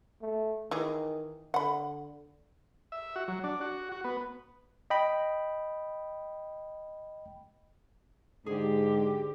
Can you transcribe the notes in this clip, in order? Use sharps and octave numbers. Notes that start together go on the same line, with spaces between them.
A3
D#3 E3 G#4
D3 F#5 B5
E5
F#4
F#3
D4
F#4
F#4
B3
D#5 G5 B5
G#2 D3 G4 G#4